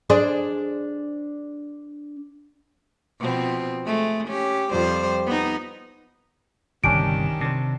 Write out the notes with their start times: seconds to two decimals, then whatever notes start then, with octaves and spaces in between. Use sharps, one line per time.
0.10 D4 G#4 C5
3.20 B2 F3 C4
3.85 G#3 A3
4.28 C#4 G4
4.71 F2 G3 C5
5.27 B3 D#4
6.84 G1 C2 D#3 C#4 D4 G4 D7
7.41 C3 D4 C5